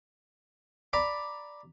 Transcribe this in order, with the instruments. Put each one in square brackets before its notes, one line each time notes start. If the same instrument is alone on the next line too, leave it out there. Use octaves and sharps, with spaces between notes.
[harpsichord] D5 A#5 B5 D6